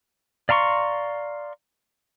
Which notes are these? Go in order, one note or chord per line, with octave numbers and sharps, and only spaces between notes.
D5 F5 A#5 C6 C#6